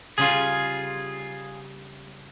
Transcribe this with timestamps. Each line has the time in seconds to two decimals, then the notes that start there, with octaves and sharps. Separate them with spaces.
0.18 C#3 G3 F4 G#4